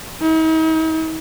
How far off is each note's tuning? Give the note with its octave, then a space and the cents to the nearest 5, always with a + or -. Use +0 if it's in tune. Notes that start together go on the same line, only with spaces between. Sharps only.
D#4 +45